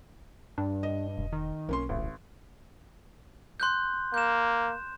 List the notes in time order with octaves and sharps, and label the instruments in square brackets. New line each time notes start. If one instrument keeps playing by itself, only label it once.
[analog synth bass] G2 [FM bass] D4
[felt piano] D#5
[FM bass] E1
[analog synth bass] D#3
[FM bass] B1 [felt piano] A#3 C#4 C6
[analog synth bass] D1 [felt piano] A1
[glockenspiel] C6 F#6 G6
[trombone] A#3 [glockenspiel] G6 E7